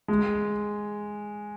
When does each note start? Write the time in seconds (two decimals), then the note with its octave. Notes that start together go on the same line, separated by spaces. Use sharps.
0.08 G#3